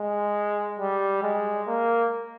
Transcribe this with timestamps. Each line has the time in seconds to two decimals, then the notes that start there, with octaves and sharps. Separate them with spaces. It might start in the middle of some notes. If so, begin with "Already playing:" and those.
Already playing: G#3
0.79 G3
1.23 G#3
1.67 A#3